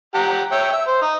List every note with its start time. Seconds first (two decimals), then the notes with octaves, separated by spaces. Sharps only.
0.14 G4 F#5 A#5
0.52 C#5 E5 G5
0.72 E5
0.88 C5
1.02 D#4